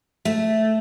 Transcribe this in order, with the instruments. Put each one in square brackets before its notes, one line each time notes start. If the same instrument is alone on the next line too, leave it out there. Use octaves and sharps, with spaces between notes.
[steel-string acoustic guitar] A3